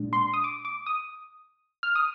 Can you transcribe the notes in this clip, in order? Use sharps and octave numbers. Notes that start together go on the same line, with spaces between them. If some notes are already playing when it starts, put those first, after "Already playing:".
Already playing: A#2 G#3 D4
C6
D#6
D6
D6
D#6
F6
D#6